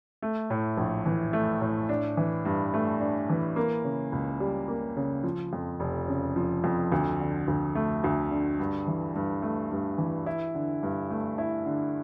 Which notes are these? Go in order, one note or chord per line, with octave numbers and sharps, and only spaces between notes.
A3
A2
A#1
E3
A3
A2
D4
E3
G2
A3
D4
E3
A#3
C#3
C#2
G3
A#3
C#3
F3
F2
F1
C#3
F3
F2
D2
D3
D2
A3
D2
D3
G2
E3
G2
A3
G2
E3
E4
D3
G2
A3
E4
D3